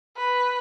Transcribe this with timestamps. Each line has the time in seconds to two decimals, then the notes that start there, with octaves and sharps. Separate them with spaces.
0.17 B4